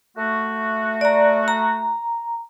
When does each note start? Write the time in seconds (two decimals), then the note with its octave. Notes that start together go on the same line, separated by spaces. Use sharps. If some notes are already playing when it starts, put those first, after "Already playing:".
0.17 A3 F#4
1.01 D5 A#5
1.48 A#5